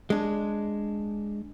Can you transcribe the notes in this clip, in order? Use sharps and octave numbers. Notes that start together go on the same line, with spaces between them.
G#3 D4